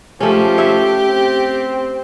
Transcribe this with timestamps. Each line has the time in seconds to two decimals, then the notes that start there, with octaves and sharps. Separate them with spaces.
0.20 F3 A3 C#4 G4
0.58 C#5 E5
1.07 C4